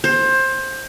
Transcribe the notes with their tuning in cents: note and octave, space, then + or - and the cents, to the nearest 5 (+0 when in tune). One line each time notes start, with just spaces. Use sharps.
C5 +20